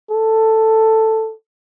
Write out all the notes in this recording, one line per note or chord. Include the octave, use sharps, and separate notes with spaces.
A4